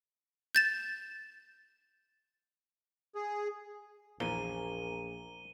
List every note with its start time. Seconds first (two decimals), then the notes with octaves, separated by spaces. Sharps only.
0.55 G6 A6 E7
3.15 G#4
4.20 A#1 E2 A#2 F3 A#3 G#5 D#7 G7